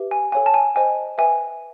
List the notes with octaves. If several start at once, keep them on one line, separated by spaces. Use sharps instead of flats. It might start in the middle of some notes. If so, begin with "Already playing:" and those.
Already playing: G4 B4 E5
G#5
A4 C#5 F5 G#5
A5
G#5
C5 D#5 G5 G#5
B4 E5 G5 G#5